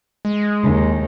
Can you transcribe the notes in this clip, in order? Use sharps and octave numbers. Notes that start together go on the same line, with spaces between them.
G#3
D#2